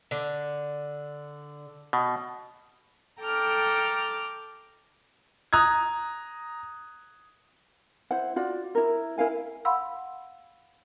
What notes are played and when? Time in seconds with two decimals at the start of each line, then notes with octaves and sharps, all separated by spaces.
0.11 D3
1.93 B2
3.20 A4 G5 A5 A#5 D6 F6
5.53 A#5 D#6 F#6 G#6
8.11 E4 C5 F#5
8.36 F4 F#4 D5
8.75 E4 A#4
9.18 E4 A#4 F5 G#5
9.65 F5 F#5 B5 C6 E6